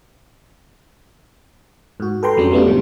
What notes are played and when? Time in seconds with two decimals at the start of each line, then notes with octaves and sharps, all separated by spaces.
2.00 G#2 F#4
2.23 A4 B4 G5 A#5 C6
2.37 F2 F#3 G#3 C#4 D4
2.52 G3 A3 B3 C#4 D4 F4
2.66 G#2 C3 D#3 A3